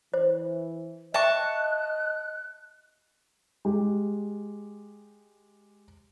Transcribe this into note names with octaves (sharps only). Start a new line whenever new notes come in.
E3 C5
D#5 E5 G5 A5 C#6 F#6
G#3 G4